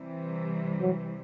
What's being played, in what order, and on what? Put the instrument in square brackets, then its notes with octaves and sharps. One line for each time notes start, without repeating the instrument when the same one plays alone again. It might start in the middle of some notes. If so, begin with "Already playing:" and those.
Already playing: [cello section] C3 E3 G3
[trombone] F#3